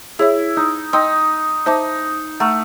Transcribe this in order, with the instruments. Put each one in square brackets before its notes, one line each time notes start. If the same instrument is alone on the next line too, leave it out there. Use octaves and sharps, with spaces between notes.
[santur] E4 [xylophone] G#4 C#5 E5
[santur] D#4
[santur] D#4 [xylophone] D#5 G5 C6 E6
[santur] D#4 [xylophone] C5 E5 A5 D6
[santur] A3 [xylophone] F#5 A#5 C#6 F6